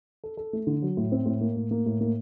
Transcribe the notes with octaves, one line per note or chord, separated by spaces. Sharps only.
A4
A4
A3
D3
F#3
A2
C4
A2
A#3
A2
A#3
A2
A#3